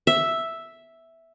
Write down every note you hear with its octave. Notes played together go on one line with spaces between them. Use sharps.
E5